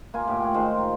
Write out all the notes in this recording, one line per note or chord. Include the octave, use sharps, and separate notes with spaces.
A#3 F4 G#5
A2 G4 D5
C#5 F#5 G5
D#3 G#3 F4 C5
A#5